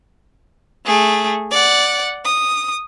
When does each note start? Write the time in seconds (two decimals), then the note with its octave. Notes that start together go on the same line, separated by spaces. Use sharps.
0.86 A3 G#4
1.51 D5 F#5
2.25 D#6